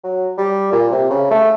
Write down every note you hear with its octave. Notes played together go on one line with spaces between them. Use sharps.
F#3
G3
A#2
C3
C#3
A3